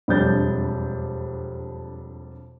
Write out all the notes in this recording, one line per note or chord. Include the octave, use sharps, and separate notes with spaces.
E1 F2 G3 D4 G6 A6